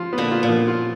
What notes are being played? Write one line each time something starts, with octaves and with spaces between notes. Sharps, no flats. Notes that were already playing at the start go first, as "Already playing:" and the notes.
Already playing: F3 F4
B3
A#2 D3
F4
A#2
F3
F4